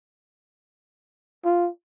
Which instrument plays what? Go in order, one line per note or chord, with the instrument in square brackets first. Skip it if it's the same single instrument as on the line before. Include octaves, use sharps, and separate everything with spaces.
[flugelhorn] F4